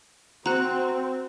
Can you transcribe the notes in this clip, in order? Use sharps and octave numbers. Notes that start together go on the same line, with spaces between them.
C4 F#4 A#5 F#6